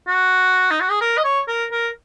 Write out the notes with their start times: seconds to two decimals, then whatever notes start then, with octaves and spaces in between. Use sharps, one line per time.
0.07 F#4
0.70 D#4
0.81 F#4
0.90 G#4
1.01 A#4
1.17 D#5
1.24 C#5
1.48 A#4
1.71 A#4